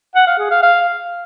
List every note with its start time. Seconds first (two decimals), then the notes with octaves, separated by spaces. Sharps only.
0.15 F#5
0.27 F5
0.39 G#4
0.51 F5
0.63 F5